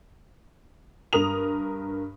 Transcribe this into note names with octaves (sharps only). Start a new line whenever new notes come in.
G2 A#4 D#6 F7